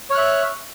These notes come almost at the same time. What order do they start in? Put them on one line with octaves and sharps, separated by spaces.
C#5 F6 F#6 E5